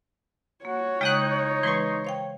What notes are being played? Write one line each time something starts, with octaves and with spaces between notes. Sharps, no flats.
A#3 F#4 C#5
C#3 G#3 D#4 G5 D#6 F#6
E3 G#3 B4 C6 C#6
C5 F5 G5